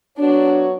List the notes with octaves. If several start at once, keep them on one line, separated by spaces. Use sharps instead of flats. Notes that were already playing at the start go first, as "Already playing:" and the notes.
F#3 B3 D4 F#4 C#5